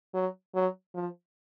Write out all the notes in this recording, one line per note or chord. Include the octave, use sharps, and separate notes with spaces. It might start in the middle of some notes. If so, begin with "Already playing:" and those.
F#3
F#3
F3